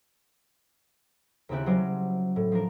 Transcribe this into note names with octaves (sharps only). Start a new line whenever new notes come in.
D#2 C#3 C4 E4 G4 F#6
F#3 G3 C#4 F#4 C5 D5
A2
F3 D4 A#4